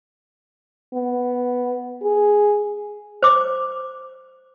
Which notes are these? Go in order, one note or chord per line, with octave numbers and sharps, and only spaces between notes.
B3
G#4
C5 D6